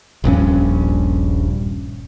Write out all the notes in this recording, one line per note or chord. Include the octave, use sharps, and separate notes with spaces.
D#1 A#1 G2 C#4